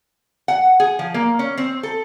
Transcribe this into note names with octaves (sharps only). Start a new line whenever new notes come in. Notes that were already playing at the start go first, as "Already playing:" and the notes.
F#5
G#4
F3
A#3
C#4
C4
A4